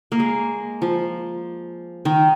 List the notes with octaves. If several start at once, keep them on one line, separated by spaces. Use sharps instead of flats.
A#3
G#3
F3
D#3